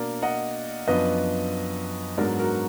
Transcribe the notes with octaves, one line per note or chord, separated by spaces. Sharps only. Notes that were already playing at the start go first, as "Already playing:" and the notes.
Already playing: B2 A#3 D4 A#4 D5
D#5 F#5
F#2 F3 B3 D4 B4 D#5
G#2 F#3 B3 D4 A#4 D5
F#4 A#4